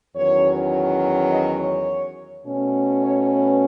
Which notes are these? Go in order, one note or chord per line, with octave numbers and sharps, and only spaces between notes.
E2 D#3 F#3 C#4 C#5
D#5
C#5
B2 A3 C#4
C#5
B4